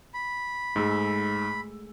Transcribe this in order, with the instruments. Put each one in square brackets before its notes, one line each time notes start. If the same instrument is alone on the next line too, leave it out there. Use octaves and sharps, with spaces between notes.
[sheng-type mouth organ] B5
[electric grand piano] G#2 E6 [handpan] G#3 A3 G#4